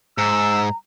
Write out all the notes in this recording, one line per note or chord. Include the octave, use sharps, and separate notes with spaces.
G#2 A#5 E6